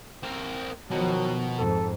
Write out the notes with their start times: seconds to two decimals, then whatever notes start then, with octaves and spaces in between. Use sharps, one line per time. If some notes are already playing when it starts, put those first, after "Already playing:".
0.23 C4 A#4
0.91 B2 D#3 F3 F#3
1.58 F2 G#2 A4